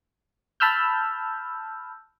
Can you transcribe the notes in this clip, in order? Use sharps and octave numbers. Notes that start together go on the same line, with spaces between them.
A5 B5 E6 F6 G6